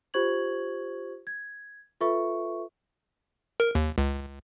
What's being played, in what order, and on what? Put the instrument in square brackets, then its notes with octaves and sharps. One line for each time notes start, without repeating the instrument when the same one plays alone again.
[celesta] F4 G4 C5 C#6 G#6 F#7
G#6
F4 A4 B4 E5 C#6
[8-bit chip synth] A#4
D#2
C#2